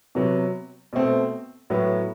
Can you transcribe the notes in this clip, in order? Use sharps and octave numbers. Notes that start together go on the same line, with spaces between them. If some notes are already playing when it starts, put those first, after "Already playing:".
C3 F#3 B3
B2 A3 C4
A2 F#3 B3